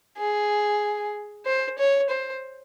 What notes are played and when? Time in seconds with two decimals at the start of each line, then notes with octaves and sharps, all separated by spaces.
0.18 G#4
1.46 C5
1.78 C#5
2.10 C5